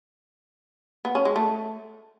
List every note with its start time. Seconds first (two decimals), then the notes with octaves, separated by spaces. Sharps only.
1.05 B3
1.15 C#4
1.25 G#3
1.36 A3